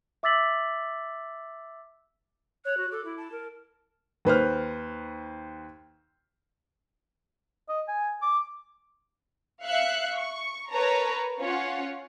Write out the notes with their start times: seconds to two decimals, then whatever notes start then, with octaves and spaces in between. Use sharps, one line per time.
0.23 E5 D6 E6 A6 B6 F#7
2.65 C#5 F#6
2.77 F#4
2.92 A4 D6
3.05 E4
3.17 A5
3.32 A#4
4.25 D#2 B4 C5 F6
7.68 D#5
7.88 G#5
8.22 D6
9.64 E5 F5 F#6 C#7
10.16 C#6
10.70 A#4 B4 C#5 A5 A#5
11.40 C#4 F4 C#5 F#5